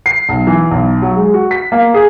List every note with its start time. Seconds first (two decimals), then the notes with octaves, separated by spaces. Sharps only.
0.06 C7
0.29 B1
0.47 E3
0.71 B1
1.02 F#3
1.15 G#3
1.34 F#4
1.51 B6
1.72 A#3
1.94 G#4